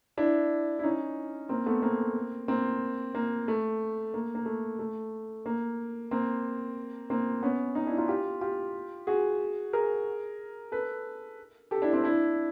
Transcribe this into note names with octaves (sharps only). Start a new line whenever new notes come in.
D4 E4
E4
C#4 D#4
A#3 C4
A3 B3
A#3 C4
A#3 C4
A#3
A3
A#3
A#3
A3
A3
A#3
A#3 C4
A#3 C4
B3 C#4
C#4 D#4
D4 E4
D#4 F4
F4 G4
F4 G4
F#4 G#4
G#4 A#4
A4 B4
G4 A4
D4 E4
C4 D4
D4 E4